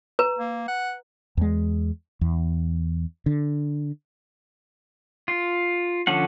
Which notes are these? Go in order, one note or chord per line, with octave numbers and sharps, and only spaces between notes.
B4 A#5
A#3
F#5
E2 G#3
E2
D3
F4
D3 F3 C#4 F#5